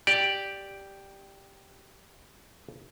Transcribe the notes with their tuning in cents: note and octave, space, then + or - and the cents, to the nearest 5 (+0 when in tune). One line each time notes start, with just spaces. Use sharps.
G4 +0 D5 +0